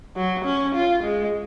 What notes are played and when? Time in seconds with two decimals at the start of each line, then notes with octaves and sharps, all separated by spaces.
0.16 F#3
0.45 C#4
0.75 F4
1.04 G#3